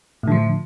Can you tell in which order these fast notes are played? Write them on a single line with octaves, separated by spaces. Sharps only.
A2 D3 F3